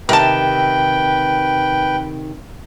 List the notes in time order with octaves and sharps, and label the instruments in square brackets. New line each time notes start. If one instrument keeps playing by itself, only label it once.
[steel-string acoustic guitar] C3 D#3 [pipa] A#4 A5 [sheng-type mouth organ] B4 G5